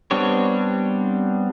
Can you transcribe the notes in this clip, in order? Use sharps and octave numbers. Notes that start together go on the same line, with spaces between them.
G3 B3 C4 D4 C#5